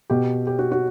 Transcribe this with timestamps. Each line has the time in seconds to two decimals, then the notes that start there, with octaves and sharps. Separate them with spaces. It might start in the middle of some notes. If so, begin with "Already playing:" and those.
0.10 B2 G4
0.47 G4
0.59 F#4
0.71 F#4